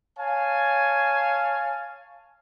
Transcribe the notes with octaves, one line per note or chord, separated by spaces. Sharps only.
C#5 F5 G#5 A5